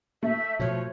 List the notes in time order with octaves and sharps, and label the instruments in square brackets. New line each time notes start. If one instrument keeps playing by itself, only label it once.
[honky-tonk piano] A3 [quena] E5
[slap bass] B2 F3 [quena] C#5